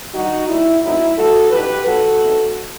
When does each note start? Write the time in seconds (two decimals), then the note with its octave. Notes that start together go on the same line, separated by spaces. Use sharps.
0.14 G2 D#3 G3 D#4 F#4
0.48 D#2 D#3 G3 E4
0.82 F#2 F#3 A3 C4 D#4 E4
1.16 G2 E3 A3 F#4 A4
1.50 F#2 E3 G3 D#4 G4 B4
1.85 B2 F#3 B3 D#4 F#4 A4
2.19 E2 B2 A3 C4 D#4